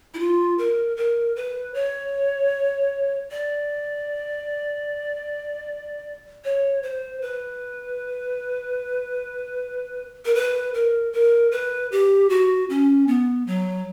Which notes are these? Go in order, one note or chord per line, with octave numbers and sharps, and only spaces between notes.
E4
F4
A#4
A#4
B4
C#5
D5
C#5
C5
B4
A#4
B4
A#4
A#4
B4
G4
F#4
C#4
B3
F#3